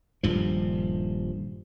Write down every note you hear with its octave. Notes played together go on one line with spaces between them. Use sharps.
D#1 G2 F3